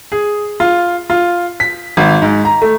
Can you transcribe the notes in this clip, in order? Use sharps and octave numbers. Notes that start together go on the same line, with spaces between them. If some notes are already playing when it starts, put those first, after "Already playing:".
G#4
F4
F4
B6
G#1
G#2
A#5
A3